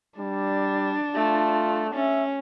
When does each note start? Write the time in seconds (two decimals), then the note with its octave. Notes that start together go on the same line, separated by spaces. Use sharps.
0.18 G3 D4
1.15 A3 F4
1.95 C#4 E5